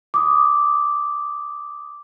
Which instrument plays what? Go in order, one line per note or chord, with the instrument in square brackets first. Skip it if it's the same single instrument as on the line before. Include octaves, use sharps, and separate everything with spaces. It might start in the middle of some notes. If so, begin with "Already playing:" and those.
[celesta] D6 D#6